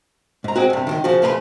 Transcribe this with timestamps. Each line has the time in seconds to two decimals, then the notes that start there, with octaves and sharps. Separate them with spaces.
0.44 G#2 A#5
0.56 G#3 C4 F#4
0.70 G2 C3
0.87 C#2 G#2 D#3
1.04 C#3 F3 F#4
1.22 F2 C#3 B4 A#5 C6